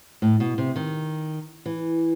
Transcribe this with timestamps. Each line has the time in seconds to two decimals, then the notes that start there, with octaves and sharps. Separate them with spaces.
0.22 A2
0.40 B2
0.58 C3
0.76 D#3
1.66 E3